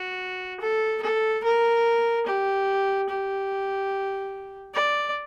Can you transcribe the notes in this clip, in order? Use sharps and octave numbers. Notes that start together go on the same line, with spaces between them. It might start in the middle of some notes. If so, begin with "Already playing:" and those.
Already playing: F#4
A4
A4
A#4
G4
G4
D5